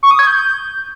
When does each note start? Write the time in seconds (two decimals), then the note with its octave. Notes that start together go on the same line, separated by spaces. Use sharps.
0.03 C#6
0.11 D#6
0.19 G#6
0.27 G6